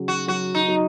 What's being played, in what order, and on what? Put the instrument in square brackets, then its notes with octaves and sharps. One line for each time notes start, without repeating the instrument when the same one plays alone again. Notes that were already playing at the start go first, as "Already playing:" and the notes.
Already playing: [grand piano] C#3 F#3
[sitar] F#4
[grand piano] F#3 [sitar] F#4
[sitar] D#4
[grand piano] F#3